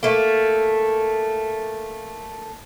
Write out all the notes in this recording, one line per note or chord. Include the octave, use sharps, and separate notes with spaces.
A3 A#3